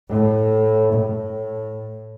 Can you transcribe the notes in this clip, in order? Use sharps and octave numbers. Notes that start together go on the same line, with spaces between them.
A2
A2